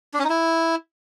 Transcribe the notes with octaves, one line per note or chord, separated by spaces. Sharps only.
D4
C#4
D#4
E4